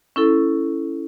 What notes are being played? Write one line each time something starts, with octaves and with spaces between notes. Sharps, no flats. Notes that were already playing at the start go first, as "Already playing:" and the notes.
C#4 E4 A4